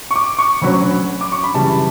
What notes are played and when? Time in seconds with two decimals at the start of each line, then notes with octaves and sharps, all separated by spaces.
0.11 C#6
0.16 D6
0.39 C#6
0.62 D2 D3 F#3 C#4 B5
1.21 D6
1.32 C#6
1.44 B5
1.54 F#2 C#3 E3 G3 A5